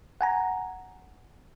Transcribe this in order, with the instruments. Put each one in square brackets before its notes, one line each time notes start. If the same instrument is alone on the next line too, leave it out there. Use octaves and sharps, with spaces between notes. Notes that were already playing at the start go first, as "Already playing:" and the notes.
[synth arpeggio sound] F#5 G#5 A#5